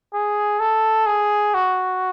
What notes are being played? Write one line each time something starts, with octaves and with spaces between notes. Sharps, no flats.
G#4
A4
G#4
F#4